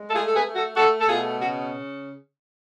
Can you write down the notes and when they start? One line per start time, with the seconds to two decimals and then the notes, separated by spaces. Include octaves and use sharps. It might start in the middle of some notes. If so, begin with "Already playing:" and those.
Already playing: G#3
0.09 A4
0.13 A3 F4 G#4
0.26 A4
0.34 G#4 B4
0.45 A3
0.55 F#4 A4
0.76 A3 F#4 A4
1.01 A4
1.08 B2 F4 G#4
1.39 C#3 F#4